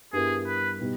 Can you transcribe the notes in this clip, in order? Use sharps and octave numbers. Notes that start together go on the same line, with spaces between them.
G2 G3 B3 E4 G#4 A#4
B4
B2 G3 B3 D#4